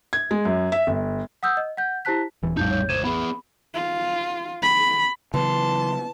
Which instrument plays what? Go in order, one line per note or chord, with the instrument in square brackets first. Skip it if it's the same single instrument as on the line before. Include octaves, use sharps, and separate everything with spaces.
[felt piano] G#6
G#3
F#2
E5
G1
[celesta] F#5 D#6 E6 G6
D#5
F#5 G6
E4 G4 C5 A5 F#6 B6
[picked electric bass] D#1 E3
[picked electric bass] A#1 F2 A2 [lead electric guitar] G3 D#4 [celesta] A5 G6
[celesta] C#5 G6
[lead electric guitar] C#2 C5 [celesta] G#6 D#7 E7
[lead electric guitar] B3 G#4 [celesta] B5
[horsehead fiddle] F4
B5
[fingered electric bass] C#3 F#3 B3 [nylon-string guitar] E3 [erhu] A5 [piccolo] C6